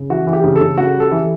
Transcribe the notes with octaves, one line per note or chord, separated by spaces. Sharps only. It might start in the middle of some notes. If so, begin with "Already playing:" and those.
Already playing: C#3
E3 F#4
E3
G4
C#3
A4
C#3
C#3 F#4
G3
A4
E3